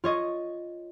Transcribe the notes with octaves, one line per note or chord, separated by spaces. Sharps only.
F4 C#5 D#5